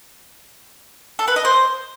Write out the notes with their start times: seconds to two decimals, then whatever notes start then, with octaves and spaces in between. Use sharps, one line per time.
1.19 A4
1.28 B4
1.36 D#5
1.45 C5